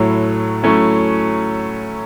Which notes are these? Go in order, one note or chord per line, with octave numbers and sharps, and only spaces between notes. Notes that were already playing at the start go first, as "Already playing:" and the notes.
Already playing: A2 F#3 A3 E4
F#3 A3 C#4 E4